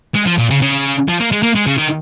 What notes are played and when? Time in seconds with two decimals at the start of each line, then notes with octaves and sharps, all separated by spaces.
0.15 G#3
0.26 F3
0.38 A#2
0.50 C#3
0.62 C#3
1.08 F3
1.20 A#3
1.32 G#3
1.43 A#3
1.55 G#3
1.67 C#3
1.78 D#3